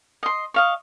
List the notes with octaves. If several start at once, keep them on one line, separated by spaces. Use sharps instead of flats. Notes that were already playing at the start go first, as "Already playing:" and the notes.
D#5 C6
D#5 F5 C#6